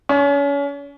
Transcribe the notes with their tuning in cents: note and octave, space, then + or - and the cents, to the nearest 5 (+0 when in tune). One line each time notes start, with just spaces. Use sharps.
C#4 +35